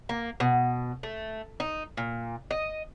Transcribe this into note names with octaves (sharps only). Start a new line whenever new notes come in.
A#3
B2
A3
D#4
A#2
D#5